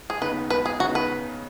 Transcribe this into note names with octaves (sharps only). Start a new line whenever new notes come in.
G#4
D#2 C#3 B3 D#4 B4
B4
G#4
C#3 B3 D#4 F#4
B4